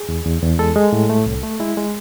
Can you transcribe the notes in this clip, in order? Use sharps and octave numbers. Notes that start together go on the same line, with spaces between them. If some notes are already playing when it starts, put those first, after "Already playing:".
Already playing: G#4
E2
E2
E2
G#3 A4
G#3
A2
A3
C2
A3
G#3 E4
G#3